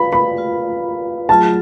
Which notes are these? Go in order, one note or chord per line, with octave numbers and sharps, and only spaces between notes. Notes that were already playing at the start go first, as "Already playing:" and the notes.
Already playing: F4 B4 F5 B5
B5
F4 B4 F5
F#3 A3 F4 G#4 A5